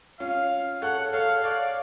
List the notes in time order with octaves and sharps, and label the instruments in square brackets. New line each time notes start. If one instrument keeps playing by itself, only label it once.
[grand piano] C#4 F4 [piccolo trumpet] F5
[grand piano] A4 C#5 [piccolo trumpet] F#5
[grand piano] A4 C#5 [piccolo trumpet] F5
[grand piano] C#5 F5 [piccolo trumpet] D5